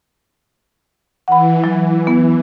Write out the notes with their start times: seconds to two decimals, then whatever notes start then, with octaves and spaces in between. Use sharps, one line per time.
1.28 E3 F#5 B5
1.64 F#3
2.07 B3